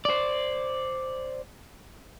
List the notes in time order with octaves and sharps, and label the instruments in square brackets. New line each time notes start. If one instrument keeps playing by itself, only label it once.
[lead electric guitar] C5 D5